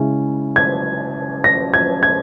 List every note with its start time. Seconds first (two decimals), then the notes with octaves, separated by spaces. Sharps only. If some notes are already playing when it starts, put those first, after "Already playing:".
Already playing: C#3 G#3 C#4 E4
0.56 G#6
1.44 A#6
1.74 G#6
2.03 G#6